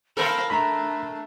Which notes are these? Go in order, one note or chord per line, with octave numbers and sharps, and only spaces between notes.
A4 A#4 C5 F5 B5
A3 D4 A#5 B5